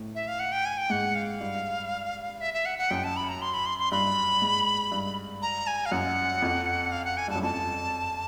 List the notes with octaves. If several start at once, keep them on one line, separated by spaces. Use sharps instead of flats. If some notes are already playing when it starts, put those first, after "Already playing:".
Already playing: A2
E5
F5
F#5
G5
G#5
G5
G#2 F#5
F5
G2
E5
E5
F#5
F#5
F#2 G5
A5
B5
A#5
C6
B5
C6
C6
G2 B5
G#2
G2
A#5
G#5
F5
F#2 F#5
F2
F5
F#5
G#5
G2 A5
F#2
F2 A5